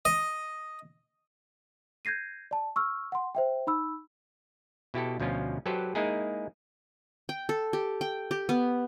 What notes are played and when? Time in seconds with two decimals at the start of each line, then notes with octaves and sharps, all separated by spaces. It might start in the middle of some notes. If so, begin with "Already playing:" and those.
0.05 D#5
2.05 G6 G#6 A#6 C7 D#7
2.51 D5 A5
2.76 C#6 E6 F6
3.12 F#5 C6
3.35 C5 E5 G5
3.67 D#4 B5 E6
4.94 B2 E4 G4 A4
5.20 D2 B2 F3 C#4 F4
5.66 F#3 G4 A4 B4 C5
5.95 G#3 A#3 D#4 E4 G#4
7.29 G5
7.49 A4
7.73 G4
8.01 G5
8.31 G4
8.49 B3